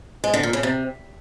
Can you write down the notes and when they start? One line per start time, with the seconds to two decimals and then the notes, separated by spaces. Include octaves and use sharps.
0.24 G#3
0.34 D3
0.43 A#2
0.53 C#3
0.63 C3